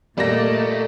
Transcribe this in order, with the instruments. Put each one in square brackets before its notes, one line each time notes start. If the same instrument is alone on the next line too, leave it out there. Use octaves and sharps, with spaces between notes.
[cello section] A#2 D5 D#5 [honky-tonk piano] G3 A#3 A#6 [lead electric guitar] A3